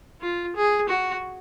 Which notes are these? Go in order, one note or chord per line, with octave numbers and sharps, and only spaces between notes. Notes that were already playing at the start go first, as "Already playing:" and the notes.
F4
G#4
F#4